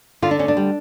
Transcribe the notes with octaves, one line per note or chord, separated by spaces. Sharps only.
D3 F4
D4
D2 C#4
D4
G3